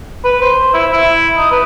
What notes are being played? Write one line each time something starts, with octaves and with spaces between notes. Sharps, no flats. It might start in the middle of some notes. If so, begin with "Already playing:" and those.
B4
C5
E4
E4
D#4
B4